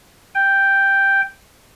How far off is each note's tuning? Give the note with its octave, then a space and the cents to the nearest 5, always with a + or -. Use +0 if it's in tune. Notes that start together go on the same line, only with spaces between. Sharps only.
G5 +0